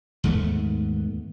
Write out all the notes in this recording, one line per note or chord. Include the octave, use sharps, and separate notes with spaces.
D#2 G#2 A3 B3